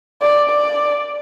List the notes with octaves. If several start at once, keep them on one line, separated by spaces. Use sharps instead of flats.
D5
D5